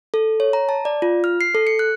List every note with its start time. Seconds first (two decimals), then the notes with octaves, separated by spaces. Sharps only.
0.14 A4
0.40 C#5
0.53 A#5
0.69 A5
0.85 D5
1.02 F4
1.24 F6
1.41 C7
1.55 A4
1.67 C#7
1.79 F#6